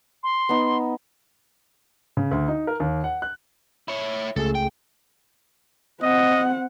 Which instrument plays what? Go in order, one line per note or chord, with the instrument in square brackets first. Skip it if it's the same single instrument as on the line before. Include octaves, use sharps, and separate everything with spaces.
[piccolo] C6
[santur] B3 D#4
[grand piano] C#3
D2
D#4
A#4
D#2
F#5
F#6
[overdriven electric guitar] E4 C#5
[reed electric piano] C#2 A3 G#4 [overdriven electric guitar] A4
[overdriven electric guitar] G5
[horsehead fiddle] C4 F#5 [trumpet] D#5